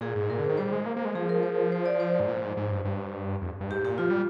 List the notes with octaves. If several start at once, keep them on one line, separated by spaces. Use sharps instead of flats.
A#2 G#4
G#2
A#2 A#4
D3
C5
D#3
G3 C5
G#3
A#3
A#3
G#3
F3 G#4
A#4
C5
C5
D5
C5
G#2
A#2
G#2
G#2
G2
G2
F2
G2
G#2 G4
A#2 G4
F3 F4
G3